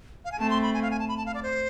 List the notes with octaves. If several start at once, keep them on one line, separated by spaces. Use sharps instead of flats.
F5
G#5
A3 C4 A5
C6
B5
G#5
F5
G#5
A5
B5
A5
F5
D5
C5